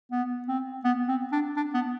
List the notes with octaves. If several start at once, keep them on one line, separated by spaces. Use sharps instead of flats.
B3
C4
B3
C4
D4
D4
B3